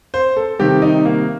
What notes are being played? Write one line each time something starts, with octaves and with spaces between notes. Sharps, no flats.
C5
A4
C3 D#3 G3 G4
D#4
A#3